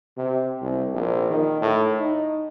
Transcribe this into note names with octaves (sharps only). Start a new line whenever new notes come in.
C3
C2
A#1
D#3
A2
D#4